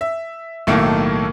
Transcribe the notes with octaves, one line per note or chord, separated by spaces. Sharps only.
E5
B1 A2 D#3 A3 A#3